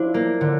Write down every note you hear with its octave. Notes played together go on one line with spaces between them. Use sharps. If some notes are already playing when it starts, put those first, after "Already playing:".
Already playing: F3 D4 E4
A#3
D3